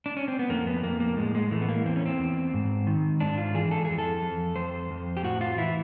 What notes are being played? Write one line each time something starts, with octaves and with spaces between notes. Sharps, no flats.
D4
C#4
C4
B3
F2 A#3
B3
F2 A#3
A#3
A2 G#3
G#3
E3 A3
B3
A#3
E2 C4
C#4
C4
E2
G#2
D#3
G#2 D4
F4
E3 G#4
A4
F2 G#4
A4
F2
F2 C5
F2
G4
A2 F#4
F4
E3 E4